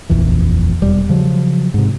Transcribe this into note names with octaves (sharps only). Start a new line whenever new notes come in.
D#1 A#1 F2 E3
E1 G3
C#3 F3 F#3
G#2 C3